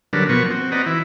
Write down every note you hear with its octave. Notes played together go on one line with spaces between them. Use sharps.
D3 F#3 G3 D4 A#4 B4
B2 F3 B3 A#4 C#6
C4 F#4
C4 F#4 B4 D5 D#5 A#5
E3 E4